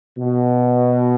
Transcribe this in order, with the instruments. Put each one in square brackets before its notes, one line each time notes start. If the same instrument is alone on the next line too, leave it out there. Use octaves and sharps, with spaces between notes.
[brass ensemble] B2